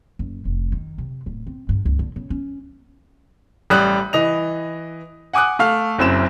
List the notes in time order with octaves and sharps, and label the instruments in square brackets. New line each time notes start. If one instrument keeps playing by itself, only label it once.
[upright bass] F#1
F1
D#3
C3
D1
C4
G2
C#2
D3
C#3
C#4
[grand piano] A1 G3 D#6 F#6
E3 D#5 F7
F#5 G#5 D6 D#6 F#6
A3 F5 F6
F#1 F#2 C4 E4 E7